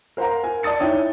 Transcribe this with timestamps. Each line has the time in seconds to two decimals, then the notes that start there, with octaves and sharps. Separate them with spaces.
0.17 A#4 C5 F5 F#5 A#5
0.43 A#4 G#5
0.63 D5 A5 D#6 A6 C#7
0.80 D#4 E4 C#5 G5 D#6